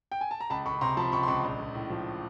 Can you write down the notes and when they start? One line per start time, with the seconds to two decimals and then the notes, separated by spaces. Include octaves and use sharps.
0.12 G5
0.21 G#5
0.31 A5
0.40 A#5
0.50 C#2 A5 B5
0.66 C#2 B5 C#6
0.81 C3 A#5 C6
0.97 F3 A5 B5
1.12 C#2 B5 C#6
1.23 C6
1.28 C#2 B5 C#6
1.44 A#1
1.59 A#1
1.74 A2
1.90 F3